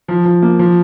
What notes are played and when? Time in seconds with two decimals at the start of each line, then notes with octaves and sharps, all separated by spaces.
0.08 F3
0.26 F3
0.42 A#3
0.59 F3